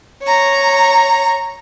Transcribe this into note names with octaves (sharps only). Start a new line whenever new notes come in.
C#5 A#5